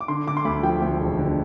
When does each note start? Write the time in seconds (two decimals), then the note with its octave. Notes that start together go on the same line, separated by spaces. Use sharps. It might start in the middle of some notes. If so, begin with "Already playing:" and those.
0.01 D6
0.08 D3 C6
0.27 D3 D6
0.37 C6
0.45 D2 B5
0.63 F3 G5
0.82 D2
1.01 E1
1.18 D3